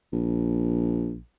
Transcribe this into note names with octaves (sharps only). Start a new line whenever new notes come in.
A#1